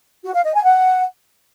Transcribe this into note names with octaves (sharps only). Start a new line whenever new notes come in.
F#4
F5
D#5
G#5
F#5